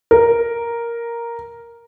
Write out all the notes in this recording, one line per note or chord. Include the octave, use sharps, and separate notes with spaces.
A#4